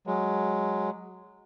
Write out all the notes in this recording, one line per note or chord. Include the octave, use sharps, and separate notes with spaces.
F#3 G#3